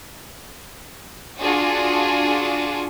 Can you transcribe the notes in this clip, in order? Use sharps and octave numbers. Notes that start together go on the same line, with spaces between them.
D4 F4 F#4 G#4